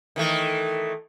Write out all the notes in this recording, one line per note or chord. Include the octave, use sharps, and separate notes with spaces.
D#3 E3 A3